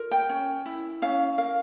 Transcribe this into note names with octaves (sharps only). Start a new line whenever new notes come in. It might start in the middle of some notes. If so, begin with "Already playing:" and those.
Already playing: F4 A#4
G5
C#4
E4
C#4 F5
A#4 F5